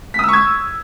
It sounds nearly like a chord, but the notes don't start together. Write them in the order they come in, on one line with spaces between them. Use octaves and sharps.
B6 D#6 E6 C#6 G#6